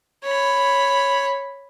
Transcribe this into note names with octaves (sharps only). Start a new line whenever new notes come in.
C#5 B5